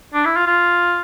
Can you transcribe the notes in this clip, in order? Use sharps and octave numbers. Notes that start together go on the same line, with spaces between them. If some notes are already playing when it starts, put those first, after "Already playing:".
D4
E4
F4
F4